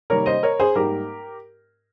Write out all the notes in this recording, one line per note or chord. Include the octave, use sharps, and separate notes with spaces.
C3 D#3 G3 A#3 A#4 C#5
C5 D#5
A#4 C#5
G#4 C5
G#2 G3 A#3 G4 A#4